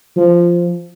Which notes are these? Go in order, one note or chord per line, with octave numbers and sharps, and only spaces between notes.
F3